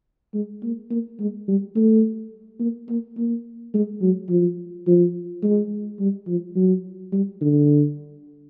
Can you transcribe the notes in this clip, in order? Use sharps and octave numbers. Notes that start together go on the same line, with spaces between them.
G#3
A#3
A#3
G#3
G3
A3
A#3
A#3
A#3
G#3
F#3
F3
F3
G#3
G3
F3
F#3
G3
D3